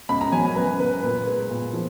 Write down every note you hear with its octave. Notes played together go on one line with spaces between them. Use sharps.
C#2 B5
A#5
F#3 G#5
G#5
C#2 B4
C#3 B4
A#2 B4
G#3 B4
A#2
F3